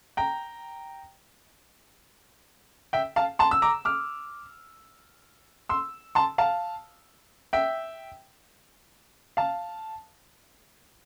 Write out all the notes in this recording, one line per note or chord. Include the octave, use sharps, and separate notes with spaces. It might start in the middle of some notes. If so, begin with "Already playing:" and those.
G5 A#5
E5 G5
F5 A5
A5 C6
E6
A#5 D6
D6 F6
C6 E6
A5 C6
F5 A5
E5 G5
F5 A5